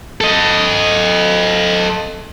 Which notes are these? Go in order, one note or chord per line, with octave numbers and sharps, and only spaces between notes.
A4 D#5